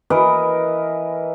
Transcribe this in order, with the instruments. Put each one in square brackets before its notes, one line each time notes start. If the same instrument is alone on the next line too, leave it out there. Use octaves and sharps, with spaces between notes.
[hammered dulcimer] E3 A#4 B4 D#5